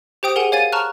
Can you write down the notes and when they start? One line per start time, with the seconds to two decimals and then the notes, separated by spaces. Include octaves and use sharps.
0.23 G4 C5 G5 D#6 D7
0.36 G#4 A#4 F#5 G#5 E7
0.52 C#5 F5 G#5 G#6 A6 D#7
0.72 A5 A#5 C#6 F6 F#6